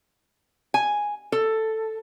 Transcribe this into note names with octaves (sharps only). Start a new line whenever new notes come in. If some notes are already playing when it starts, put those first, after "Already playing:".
G#5
A4